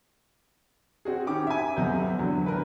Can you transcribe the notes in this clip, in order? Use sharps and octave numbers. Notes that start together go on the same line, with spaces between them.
C4 F#4 G#4
D#3 C#4 G4 D6
E5 G#5
D#1 C3 F#3 B3 G6
E2 D3 F#3
D2 A#4 B4